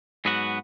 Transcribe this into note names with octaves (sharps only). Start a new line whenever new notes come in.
G#2 F#3 B3 F#4